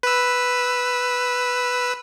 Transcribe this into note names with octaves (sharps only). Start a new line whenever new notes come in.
B4 E6